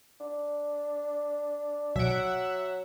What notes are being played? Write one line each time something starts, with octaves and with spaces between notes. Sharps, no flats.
D4
B1 F#3 E5 F#5 D7